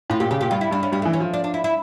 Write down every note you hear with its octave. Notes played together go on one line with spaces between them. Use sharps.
A2 F4
A#2 G4
C#3 G4
A#2 G4
G2 F4
E4
G2 D4
C#4
G2 G3
E3 A3
C#4
F3
D4
D4
E4
E4